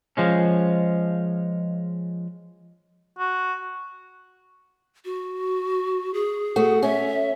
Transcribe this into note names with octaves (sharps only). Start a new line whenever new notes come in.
F3 G#3 C#4
F#4
F#4
G#4
A3 F#4
C#4 E5